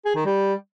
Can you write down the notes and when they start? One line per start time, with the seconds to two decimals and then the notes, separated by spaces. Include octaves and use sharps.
0.05 G#4
0.15 D#3
0.25 G3